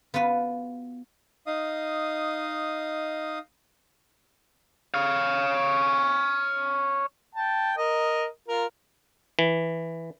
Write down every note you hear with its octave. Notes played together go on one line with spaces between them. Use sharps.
B3 F4 F#4 B4 B5
D#4 D#5 F5 D#6
C#5 F5
G5 A5
A#4 D#5
F4 A#4
E3